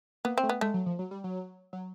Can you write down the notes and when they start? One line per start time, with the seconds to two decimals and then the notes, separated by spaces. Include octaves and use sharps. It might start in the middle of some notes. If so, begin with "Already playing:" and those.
0.25 A#3 B3
0.38 C4
0.43 A3
0.49 B3
0.61 G#3 A3
0.74 F#3
0.86 F3
0.99 F#3
1.11 G3
1.24 F#3
1.73 F#3